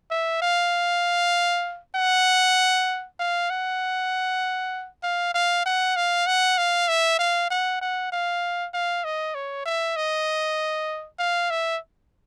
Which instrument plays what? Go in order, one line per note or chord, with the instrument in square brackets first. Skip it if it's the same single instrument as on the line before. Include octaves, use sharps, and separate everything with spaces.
[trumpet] E5
F5
F#5
F5
F#5
F5
F5
F#5
F5
F#5
F5
E5
F5
F#5
F#5
F5
F5
D#5
C#5
E5
D#5
F5
E5